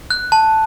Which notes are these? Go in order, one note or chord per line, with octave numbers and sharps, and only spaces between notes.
F#6
A5